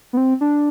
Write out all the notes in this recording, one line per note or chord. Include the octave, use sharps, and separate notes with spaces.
B3
C4
D4